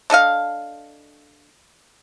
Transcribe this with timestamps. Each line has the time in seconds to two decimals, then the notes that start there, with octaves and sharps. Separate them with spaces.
0.10 D4 A4 D#5 F5